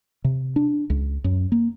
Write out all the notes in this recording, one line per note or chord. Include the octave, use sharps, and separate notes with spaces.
C3
D4
C#2
F#2
A#3